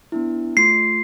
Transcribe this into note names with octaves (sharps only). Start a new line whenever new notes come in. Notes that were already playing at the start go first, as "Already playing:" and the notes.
B3 D4 E4
A3 F4 C6 C7